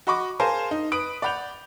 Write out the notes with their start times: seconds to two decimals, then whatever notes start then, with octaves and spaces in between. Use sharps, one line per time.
0.07 F#4 D#5 B5 C#6 D6
0.39 G#4 A#4 C5 F5 G#5 A5
0.71 D#4
0.92 B4 D#6 D7 F#7
1.22 D5 F#5 B5 G6 F7